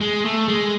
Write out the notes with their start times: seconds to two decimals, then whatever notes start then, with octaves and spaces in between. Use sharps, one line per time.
0.01 G#3
0.25 A3
0.48 G#3